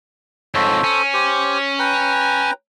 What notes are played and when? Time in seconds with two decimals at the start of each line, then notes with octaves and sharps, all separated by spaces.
0.55 F2 G#2 A4 C5 C#5
0.84 C#4
1.14 G4 C5
1.79 B4 G5 A#5